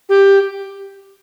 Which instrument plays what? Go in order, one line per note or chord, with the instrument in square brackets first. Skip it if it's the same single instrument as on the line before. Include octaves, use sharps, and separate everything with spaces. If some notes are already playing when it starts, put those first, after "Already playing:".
[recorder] G4